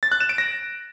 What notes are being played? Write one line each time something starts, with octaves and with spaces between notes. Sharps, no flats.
A6
F#6
E7
D7
A#6